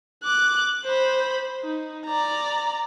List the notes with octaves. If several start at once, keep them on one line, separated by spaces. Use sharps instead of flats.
D6 F#6
C5 B5
D#4
D5 A#5